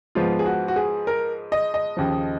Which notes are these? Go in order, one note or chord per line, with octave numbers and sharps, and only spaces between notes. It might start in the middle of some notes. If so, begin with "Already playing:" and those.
G#2 F3 B3 F4
G#4
F#4
F#4
G#4
A#4
D#5
D#5
D#2 C#3 F3